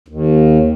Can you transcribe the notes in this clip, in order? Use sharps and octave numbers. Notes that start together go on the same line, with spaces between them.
D#2